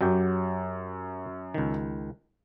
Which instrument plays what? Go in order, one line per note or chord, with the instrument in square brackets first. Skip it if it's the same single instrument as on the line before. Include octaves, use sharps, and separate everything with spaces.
[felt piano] F#2 [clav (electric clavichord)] F#3 G4 G5
[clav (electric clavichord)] C#2 D#3